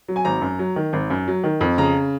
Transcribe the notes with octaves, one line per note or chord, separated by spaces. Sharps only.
F#3
G#5
G#1 A#5
F#2
F#3
D#3
G#1
F#2
F#3
D#3
F2
C#3 A#5